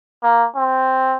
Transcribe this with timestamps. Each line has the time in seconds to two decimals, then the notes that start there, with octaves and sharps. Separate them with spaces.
0.23 A#3
0.55 C4